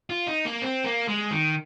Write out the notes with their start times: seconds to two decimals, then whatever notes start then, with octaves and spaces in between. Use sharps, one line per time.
0.10 F4
0.27 D#4
0.45 A#3
0.62 C4
0.85 A#3
1.08 G#3
1.31 D#3